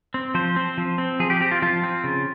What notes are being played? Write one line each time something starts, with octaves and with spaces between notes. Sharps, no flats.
C4
F3 C5
C4
F3
C4
F3 G#4
G4
C4 G4
F4
F3 F4
C4
C#3